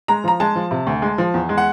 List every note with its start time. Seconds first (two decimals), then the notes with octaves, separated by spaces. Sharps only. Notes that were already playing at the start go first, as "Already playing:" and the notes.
0.08 G#3 A#5
0.24 F3 A#5
0.40 G#3 A5
0.56 F3
0.71 C3
0.87 D2
1.02 G#3
1.18 F3
1.34 E2
1.49 G#3
1.57 F#5